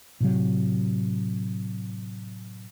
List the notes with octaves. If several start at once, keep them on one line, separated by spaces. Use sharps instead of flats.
A2 C3 F#3